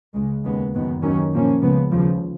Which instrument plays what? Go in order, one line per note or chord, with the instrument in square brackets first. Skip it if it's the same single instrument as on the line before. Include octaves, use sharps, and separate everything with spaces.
[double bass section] C#2 C#3 G#3
D#2 C#3 G#3 B3
F#2 D#3 G#3 B3
D#2 D#3 F#3 C#4
A#2 F3 A#3 C#4
C#2 C#3 F3 B3
D#2 C#3 F3